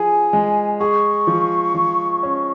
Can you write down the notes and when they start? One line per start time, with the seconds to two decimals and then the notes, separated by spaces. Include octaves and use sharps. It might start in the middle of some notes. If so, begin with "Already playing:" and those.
Already playing: F3 G#4 G#5
0.33 G#3
0.80 G#4 C#6
1.27 F3
1.75 F3
2.23 C#4